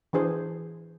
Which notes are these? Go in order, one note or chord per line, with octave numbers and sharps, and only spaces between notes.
E3 D4 G#4 C5